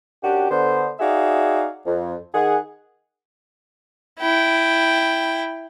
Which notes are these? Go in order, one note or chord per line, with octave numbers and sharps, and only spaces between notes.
F#2 D4 F#4 G4
D3 B3 C5
D#4 F#4 G#4 D5 E5 F5
F2
D#3 G#4 F#5
E4 G5